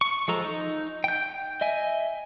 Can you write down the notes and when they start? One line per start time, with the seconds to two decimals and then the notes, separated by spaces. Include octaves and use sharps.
0.01 C#6
0.28 F3 G#3 A4 A#5
0.45 D#4
1.04 G5 G6
1.61 D#5 E5 G#5